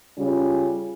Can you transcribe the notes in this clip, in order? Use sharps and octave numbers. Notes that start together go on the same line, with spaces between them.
C#3 G3 C#4 F4